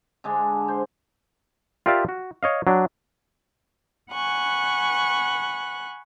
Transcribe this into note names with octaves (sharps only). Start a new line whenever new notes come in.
D3 G#3 D4
C5
F4 G4 A#4 D5 E5 F5
F#4
C#5 D#5 F5
F#3 D4
F#5 G#5 B5 C#6 F#6